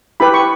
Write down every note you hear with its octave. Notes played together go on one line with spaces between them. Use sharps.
E4 G4 B4 B5
C#6